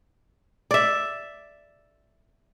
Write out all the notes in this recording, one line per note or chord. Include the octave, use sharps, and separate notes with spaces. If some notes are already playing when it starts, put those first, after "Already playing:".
D5 E5